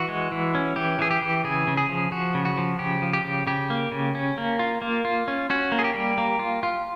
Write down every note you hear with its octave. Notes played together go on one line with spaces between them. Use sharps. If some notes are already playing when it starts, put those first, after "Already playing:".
Already playing: E3 F#4
G#3
E3
C#4
E3 G4
E3 G#4
G4
E3
C#3 G#4
C#3
G#4
F3
F3 F#4
C#3
F#4
F3
C#3 G4
F3
G4
C#3
C#3 G4
A#3
C#3
C#4
A#3
F4
A#3
F4
C#4
C#4 F#4
A#3
G#4
G4
G3
A#3
F4
F4